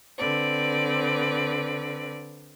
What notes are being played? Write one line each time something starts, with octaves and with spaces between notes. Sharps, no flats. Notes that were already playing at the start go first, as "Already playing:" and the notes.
D3 C4 B4 D5